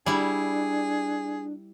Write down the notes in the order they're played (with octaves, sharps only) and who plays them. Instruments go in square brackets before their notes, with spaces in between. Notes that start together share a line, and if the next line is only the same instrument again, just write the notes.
[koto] G3 E4 [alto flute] D4 [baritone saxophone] G#4